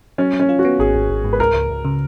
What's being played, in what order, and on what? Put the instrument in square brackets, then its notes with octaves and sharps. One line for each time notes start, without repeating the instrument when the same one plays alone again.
[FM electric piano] F#3 [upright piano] C#4
[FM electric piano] F#3
[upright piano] C#4
[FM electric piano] F4
[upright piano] F#4
[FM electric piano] B3
[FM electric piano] G#1 [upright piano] G#4
[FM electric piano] G#1
G#1
G#2
[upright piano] B4
[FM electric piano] C#2 [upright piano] A#4
[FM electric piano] C#2
C#2
C#3